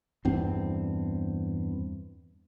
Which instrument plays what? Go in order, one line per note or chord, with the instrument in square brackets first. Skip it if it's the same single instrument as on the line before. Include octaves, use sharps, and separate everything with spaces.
[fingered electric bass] E2 G2 C4